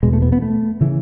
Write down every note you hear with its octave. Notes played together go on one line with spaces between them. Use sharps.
E2 B2 G#3
A3
B3
B3
A3
C#3 E3